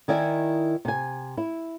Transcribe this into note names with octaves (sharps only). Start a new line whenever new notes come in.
D#3 E4 D5 G#5
C3 G#5
E4